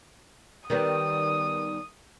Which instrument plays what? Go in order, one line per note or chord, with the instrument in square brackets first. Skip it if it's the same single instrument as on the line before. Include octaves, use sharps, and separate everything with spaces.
[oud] D#3 G3 B3 [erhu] D#6